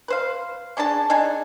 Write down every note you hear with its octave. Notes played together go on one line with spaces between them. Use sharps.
B4 C5 F5
C#4 D4 G#4 A5
D4 D#4 G#4 G#5